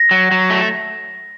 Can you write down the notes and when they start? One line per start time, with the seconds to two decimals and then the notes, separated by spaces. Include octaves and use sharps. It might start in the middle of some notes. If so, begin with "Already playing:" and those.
Already playing: A#6
0.11 F#3
0.31 F#3
0.50 A3